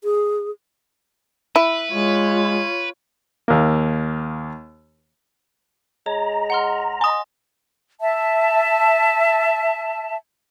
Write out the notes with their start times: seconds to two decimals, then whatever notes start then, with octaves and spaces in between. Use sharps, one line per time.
0.04 G#4
1.56 E4 B4
1.91 G#3 F4 C#5
3.48 D#2 A#3
6.06 G#3 C#5 A#5
6.50 F#5 C6 F6
7.01 D#5 G#5 C6 D#6
8.01 E5 A5